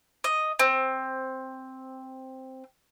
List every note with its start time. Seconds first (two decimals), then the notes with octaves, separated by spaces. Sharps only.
0.24 D#5
0.59 C4